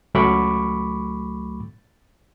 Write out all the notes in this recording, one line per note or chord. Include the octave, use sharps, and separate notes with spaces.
C#2 F#3 A3 B5 C#6 D6